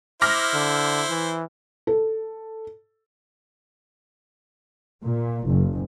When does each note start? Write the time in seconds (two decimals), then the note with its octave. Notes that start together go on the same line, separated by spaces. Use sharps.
0.22 E4 C5 D6 F6 A#6
0.54 D3
1.10 E3
1.87 A4
5.03 A#2
5.47 F#1